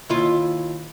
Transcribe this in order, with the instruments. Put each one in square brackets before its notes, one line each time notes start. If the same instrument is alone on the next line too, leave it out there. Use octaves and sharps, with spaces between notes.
[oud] D#2 E4 F4